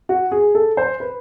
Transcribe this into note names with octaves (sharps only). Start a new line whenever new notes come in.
F#4
G#4
A4
C5
B4